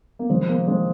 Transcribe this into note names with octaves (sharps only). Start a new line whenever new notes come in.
A#3
F1 F2 D#3 G#3 C4
A#3
G#3 C4